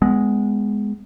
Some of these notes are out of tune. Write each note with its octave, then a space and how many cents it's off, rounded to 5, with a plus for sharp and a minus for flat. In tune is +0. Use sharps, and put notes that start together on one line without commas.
G#3 +0 B3 +15